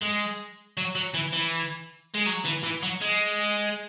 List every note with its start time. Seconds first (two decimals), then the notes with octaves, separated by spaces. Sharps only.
0.02 G#3
0.77 F#3
0.95 F#3
1.14 E3
1.33 E3
2.15 G#3
2.27 F#3
2.45 E3
2.64 E3
2.83 F#3
3.01 G#3